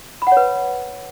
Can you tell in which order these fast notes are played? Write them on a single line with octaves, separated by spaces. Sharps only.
B5 F#5 C#5 B4